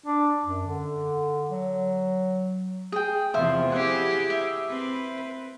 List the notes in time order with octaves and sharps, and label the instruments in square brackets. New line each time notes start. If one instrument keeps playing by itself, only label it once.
[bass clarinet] D4
F#2
D3
F#3
[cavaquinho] G#4 G5
[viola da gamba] E2 C3 F3 [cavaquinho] C5 E5 F5
[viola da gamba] E4 G4 G#4 [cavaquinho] F#5
[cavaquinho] E5
[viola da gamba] C4 B4